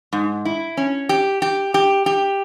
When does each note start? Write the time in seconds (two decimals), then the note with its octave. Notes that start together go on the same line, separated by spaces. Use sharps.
0.13 G#2
0.45 E4
0.77 C#4
1.09 G4
1.42 G4
1.74 G4
2.06 G4